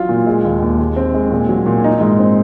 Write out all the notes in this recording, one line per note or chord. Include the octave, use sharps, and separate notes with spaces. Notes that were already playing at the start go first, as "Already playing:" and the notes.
Already playing: F#3 F4
A#2
G#3
D#2
D#2
G#3
C4
G#3
A#2
F#3
A#2
D#4
G#2
C4